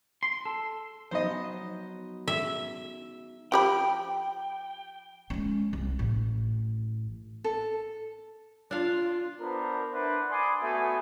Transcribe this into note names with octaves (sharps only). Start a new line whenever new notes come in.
C6
A4
F#3 B3 D#4 C5 D#5
E5
F3 G4 G5 B5
G#3 C#4
C2
A1
A4
D4 F4 F5
B3 D4 A#4 C5
D4 E4 B4 C5 F#5
D5 G#5 B5 C6 D#6
A3 B3 F#4 E5 G#5